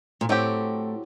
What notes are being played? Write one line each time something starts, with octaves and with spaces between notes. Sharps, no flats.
A#2
A2 F#3 C4 G4